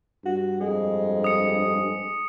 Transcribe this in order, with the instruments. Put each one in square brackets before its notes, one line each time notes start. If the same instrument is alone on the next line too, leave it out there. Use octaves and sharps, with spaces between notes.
[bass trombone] G2 [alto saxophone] F#4
[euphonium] F2 [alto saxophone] G#3
[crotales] D#6 C#7